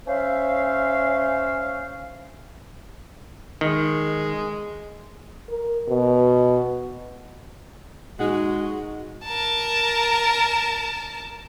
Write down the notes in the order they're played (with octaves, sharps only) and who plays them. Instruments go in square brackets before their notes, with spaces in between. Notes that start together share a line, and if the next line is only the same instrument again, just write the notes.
[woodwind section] C#4 C5 E5 F5
[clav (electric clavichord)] D#3 [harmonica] G#3
[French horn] A#4
B2
[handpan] A#2 D#4 [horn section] G#3 [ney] F#4 [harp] F#5
[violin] A#4 A5